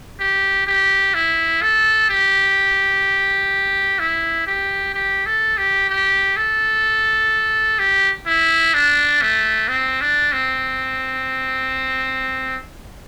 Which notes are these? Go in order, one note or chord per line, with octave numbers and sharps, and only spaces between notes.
G4
G4
E4
A4
G4
E4
G4
G4
A4
G4
G4
A4
G4
E4
D4
A3
C4
D4
C4